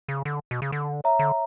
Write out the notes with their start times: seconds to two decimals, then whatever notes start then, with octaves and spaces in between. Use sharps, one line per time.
0.08 C#3
0.25 D3
0.51 B2
0.62 C#3
0.72 D3
1.04 C#5 E5 A#5
1.19 D3